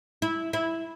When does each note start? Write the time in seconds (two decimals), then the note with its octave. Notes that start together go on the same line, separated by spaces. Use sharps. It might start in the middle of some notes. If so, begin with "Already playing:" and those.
0.22 E4
0.53 E4